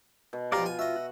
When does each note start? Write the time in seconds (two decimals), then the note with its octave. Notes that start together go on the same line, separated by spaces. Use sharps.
0.33 B2
0.52 F3 F4 G4 D5 F5 A#5
0.66 F4 G#5
0.79 F#4 D#5 E5
0.96 F#5